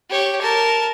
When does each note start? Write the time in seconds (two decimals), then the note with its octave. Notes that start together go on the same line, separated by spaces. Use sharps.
0.10 G4 C#5
0.42 A#4 A5